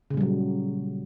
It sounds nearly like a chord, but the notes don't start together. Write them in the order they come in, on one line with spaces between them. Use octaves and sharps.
C#3 A#2 G3 F#3